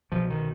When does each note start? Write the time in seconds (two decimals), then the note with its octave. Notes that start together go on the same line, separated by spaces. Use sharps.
0.12 C2 B2 F3
0.30 D#3